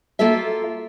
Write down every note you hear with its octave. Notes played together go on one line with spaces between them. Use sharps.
A#3 F4 F#4 A4 E5